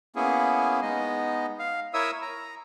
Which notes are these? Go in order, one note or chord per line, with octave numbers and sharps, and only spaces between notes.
A#3 B3 C#4 E4 G#4
G#3 B3 D#4 D#5
F5
E4 A#4 C#5 E5 D#6 E6
A#5